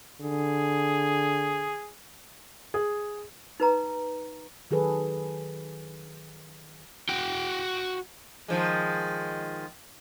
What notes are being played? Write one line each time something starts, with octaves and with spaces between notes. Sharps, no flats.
D3 G#4
G#4
D#4 B4 A#5
D#3 F#3 G#4 A4 B4
F#4 G5
D#3 F3 G#3